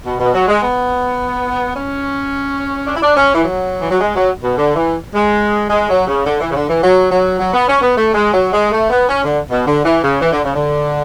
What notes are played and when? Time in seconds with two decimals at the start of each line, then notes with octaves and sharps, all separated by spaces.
0.06 B2
0.20 B2
0.34 F#3
0.48 G#3
0.62 B3
1.75 C#4
2.87 D4
2.95 E4
3.02 D4
3.16 C#4
3.34 E3
3.44 F#3
3.80 E3
3.91 F#3
4.01 G#3
4.15 F#3
4.43 B2
4.57 D3
4.76 E3
5.14 G#3
5.70 G#3
5.89 F#3
6.07 C#3
6.26 D3
6.41 E3
6.51 C#3
6.55 D3
6.68 E3
6.83 F#3
7.11 F#3
7.39 F#3
7.53 B3
7.67 C#4
7.82 B3
7.96 A3
8.14 G#3
8.33 F#3
8.52 G#3
8.71 A3
8.90 B3
9.09 C#4
9.23 D3
9.50 B2
9.65 D3
9.84 E3
10.03 C#3
10.21 E3
10.32 D3
10.43 C#3
10.54 D3